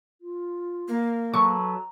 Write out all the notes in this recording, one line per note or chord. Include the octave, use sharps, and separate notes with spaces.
F4
A#3
F#3 A4 B4 A#5 C#6